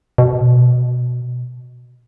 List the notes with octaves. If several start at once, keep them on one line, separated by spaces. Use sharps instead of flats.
B2